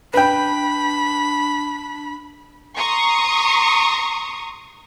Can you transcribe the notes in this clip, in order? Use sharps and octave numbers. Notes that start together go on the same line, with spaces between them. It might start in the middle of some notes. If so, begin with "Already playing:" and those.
D4 B4 G5 B5
A#5 C6 C#6 D#6